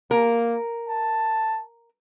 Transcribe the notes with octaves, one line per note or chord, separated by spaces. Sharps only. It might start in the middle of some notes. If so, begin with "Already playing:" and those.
A#3 A#4
A5